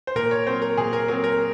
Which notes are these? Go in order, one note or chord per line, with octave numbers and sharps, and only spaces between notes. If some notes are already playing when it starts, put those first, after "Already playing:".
C5
A#2 A#4
C#5
F#3 C4 C5
A#4
A#2 G#4
A#4
F#3 C4 A#4
A#4